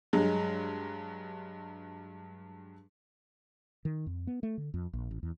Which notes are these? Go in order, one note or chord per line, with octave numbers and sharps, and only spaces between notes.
G2 F#3 G#3
D#3
F2
B3
A3
D3
F2
A#1
A1
E2